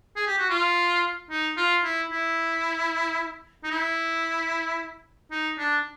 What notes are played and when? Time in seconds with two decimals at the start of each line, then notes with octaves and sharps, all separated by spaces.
0.16 G#4
0.27 G4
0.38 F#4
0.50 F4
1.30 D#4
1.57 F4
1.84 E4
2.11 E4
3.64 D#4
3.71 E4
5.31 D#4
5.58 D4